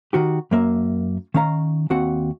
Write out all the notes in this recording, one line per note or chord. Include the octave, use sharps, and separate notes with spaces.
D#3 F#4 G4
F#2 A#3 E5
D#3 C#4 F5 A#5
D#2 C4 F#4 F#5